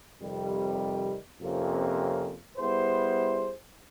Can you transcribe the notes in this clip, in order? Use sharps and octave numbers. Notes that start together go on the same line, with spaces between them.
F2 C3 D#3 G3
F2 C3 F3 A#3 C#4
G3 B3 E4 G#4 C5